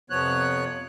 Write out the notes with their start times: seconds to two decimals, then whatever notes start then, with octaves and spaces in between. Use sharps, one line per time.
0.10 F2 C3 F3 B3 C#5 F#6